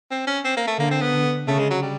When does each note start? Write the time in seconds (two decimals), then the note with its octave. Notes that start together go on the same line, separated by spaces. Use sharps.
0.11 C4
0.27 C#4
0.45 C4
0.57 A#3
0.67 A3
0.78 D3 A#3
0.91 C4
1.01 B3
1.13 D3
1.47 C#3 A3
1.59 G#3
1.70 F#3
1.82 G3